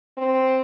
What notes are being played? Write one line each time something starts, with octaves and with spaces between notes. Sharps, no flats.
C4